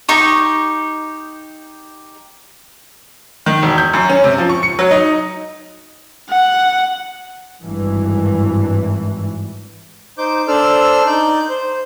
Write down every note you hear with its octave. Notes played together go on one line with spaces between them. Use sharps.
D#4 G4 C#6
D#3
E1
G6
F#2
C#4
C3
F3
C#6
C#7
F#3
D#4
F#5
G#1 G2 E3
D#4 C5 D6 G6
D4 A4 C5 D5 E6 F6
D#4 D5 G6
C5